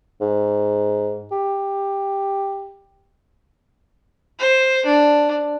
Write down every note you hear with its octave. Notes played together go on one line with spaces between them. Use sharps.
G#2
G4
C5
D4